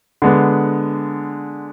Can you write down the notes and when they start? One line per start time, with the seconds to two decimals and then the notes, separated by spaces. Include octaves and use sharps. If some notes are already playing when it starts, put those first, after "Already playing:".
0.22 D3 G#3 B3